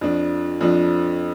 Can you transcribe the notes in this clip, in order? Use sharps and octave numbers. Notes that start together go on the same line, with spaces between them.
F2 F3 D4
F2 F3 D4